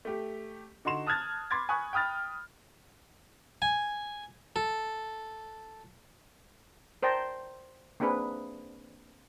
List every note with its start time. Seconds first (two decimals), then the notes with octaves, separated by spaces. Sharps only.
0.05 A3 G4
0.85 D3 D#4 F#4 C6 E7
1.07 A5 D#6 F6 F#6 G#6 A6
1.50 B5 C6 D6 G#6 A6
1.69 G#5 B5 C#6 D#6 F#6
1.93 G5 B5 D#6 F6 A6
3.62 G#5
4.56 A4
7.03 A#4 C5 D5 G5 A5 A#5
8.00 A#3 C4 D4 G#4 B4